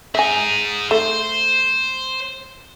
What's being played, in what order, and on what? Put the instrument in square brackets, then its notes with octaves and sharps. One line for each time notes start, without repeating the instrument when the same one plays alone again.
[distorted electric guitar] D#4 G#4 [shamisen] E5 G#5
[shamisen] A3 [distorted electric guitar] C5